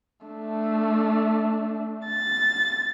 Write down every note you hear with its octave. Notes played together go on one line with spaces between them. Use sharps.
A3 D4
A6